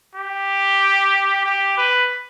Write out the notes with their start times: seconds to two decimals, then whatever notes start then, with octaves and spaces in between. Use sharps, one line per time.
0.16 G4
1.46 G4
1.78 B4